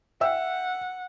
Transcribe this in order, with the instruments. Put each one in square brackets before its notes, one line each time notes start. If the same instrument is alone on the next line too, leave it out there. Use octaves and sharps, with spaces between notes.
[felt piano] E5 G5 E6 [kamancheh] F#5